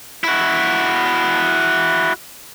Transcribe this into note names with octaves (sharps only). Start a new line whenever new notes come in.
E4 F#4